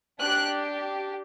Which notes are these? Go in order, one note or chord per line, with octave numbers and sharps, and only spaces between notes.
D4 G4 F#6